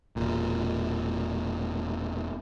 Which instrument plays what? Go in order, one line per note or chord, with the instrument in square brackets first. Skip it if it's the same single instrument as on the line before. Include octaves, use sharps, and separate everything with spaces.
[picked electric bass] E1 A#2